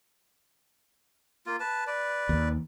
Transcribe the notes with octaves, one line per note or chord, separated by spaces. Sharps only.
A#3 F4
B4 A5
B4 D5
D#2